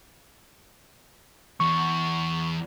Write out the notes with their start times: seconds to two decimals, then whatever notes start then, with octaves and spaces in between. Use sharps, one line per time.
1.60 E2 C#6